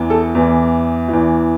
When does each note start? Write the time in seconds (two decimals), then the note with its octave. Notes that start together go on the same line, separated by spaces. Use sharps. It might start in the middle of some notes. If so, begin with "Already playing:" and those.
Already playing: E2 E3
0.10 A4
0.35 E2 E3
1.08 E2 E3